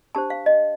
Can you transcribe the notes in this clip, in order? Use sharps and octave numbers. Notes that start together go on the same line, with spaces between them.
D4 G4 C5 A5
F5
D#5